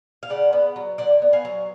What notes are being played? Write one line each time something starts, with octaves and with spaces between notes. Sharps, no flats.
F5
C#3 D5 F#5
B3
F#3
D3 D5 F#5
B3
F5 G#5
F#3